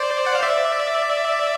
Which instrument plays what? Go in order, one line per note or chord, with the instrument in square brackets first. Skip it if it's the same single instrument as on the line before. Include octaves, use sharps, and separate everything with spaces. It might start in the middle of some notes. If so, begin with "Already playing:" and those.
Already playing: [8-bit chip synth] C5 D5
F#5
F5
D5 E5